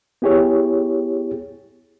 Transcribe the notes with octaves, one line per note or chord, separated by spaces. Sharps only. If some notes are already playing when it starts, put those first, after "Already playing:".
B3 E4 G4 G#4 C#5